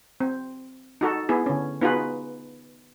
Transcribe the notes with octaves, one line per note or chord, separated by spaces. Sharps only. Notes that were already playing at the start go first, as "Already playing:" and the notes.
C4
D#4 F#4 A4
B3 E4 G#4
D3 C#4
B3 D#4 F4 F#4 G#4 B4